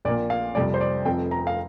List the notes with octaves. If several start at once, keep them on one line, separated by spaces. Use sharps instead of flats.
A#1 A#2 A#3 D5
F5
F2 C3 G3 D5
C5
D5
F1 F2 F3 C4 G5
A#5
F5